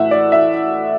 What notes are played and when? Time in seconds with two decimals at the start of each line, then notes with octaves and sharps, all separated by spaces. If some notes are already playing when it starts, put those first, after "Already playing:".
Already playing: A2 E3 A3 E5 F#5
0.11 D5
0.32 E5